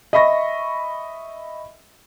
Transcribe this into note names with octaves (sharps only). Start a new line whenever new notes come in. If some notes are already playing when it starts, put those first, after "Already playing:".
D#5 E5 B5 C#6 A#6